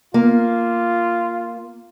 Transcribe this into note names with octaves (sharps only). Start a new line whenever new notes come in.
A#3 F4